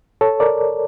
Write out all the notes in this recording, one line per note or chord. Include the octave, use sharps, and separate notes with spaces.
A4 C#5
A#4 D5